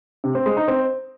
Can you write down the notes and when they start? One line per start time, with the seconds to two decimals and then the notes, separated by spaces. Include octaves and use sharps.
0.24 C3
0.35 C4
0.46 G#3
0.57 D#4
0.68 C4